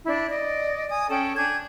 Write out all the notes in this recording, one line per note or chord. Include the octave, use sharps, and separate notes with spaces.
D4 E4
D5 D#5
G#5 D#6
C#4 A4 G5
D4 G#5 G6 G#6